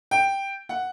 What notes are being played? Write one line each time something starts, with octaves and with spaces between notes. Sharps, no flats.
G5
F#5